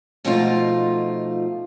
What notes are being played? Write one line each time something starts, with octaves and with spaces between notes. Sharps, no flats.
B2 F3 A3 D#4 F4